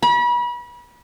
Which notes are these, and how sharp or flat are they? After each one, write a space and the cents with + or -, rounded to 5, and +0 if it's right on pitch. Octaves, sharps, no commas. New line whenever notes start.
B5 -35